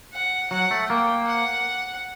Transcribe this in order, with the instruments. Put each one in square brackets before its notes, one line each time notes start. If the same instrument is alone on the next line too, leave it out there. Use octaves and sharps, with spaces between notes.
[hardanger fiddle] F#5
[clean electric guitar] F#3 [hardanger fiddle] F#5
[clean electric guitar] A3
[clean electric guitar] A#3 [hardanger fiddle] G5
[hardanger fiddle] F#5